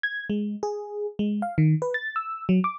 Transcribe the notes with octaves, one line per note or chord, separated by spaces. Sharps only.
G#6
G#3
G#4
G#3
F5
D#3
B4
A6
E6
F#3
D6